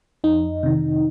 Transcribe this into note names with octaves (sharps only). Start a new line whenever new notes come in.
F2 D#4
C3 D#3